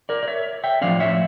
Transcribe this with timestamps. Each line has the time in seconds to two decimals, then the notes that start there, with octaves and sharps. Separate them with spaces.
0.09 A#4 D5
0.23 D5
0.28 C#5 E5
0.64 E5 G5
0.81 A2 F3 C#4 D5 F5
1.00 C#5 E5